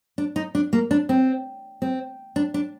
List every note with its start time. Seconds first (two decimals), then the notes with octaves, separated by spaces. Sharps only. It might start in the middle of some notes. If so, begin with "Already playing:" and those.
0.18 D4
0.36 D#4
0.55 D4
0.73 A#3
0.91 D4
1.09 C4
1.82 C4
2.36 D4
2.54 D4